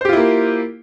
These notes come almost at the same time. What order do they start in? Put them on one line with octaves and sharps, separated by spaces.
C5 G4 F4 E4 A#3